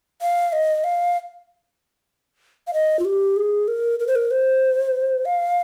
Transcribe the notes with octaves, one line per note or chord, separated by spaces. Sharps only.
F5
D#5
F5
F5
D#5
F4
G4
G#4
A#4
A#4
C5
A#4
C5
F5